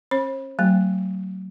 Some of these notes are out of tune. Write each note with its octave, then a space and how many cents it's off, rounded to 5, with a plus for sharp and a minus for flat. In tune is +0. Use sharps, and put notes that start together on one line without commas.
C#4 -40 C5 +40 B5 -20
F#3 +25 A3 +45 G5 +0